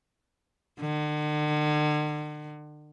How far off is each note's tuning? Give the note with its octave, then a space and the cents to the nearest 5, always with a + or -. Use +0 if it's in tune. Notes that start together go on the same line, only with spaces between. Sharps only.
D3 +40